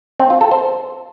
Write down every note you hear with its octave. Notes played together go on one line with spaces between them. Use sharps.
C4
F4
A4
C5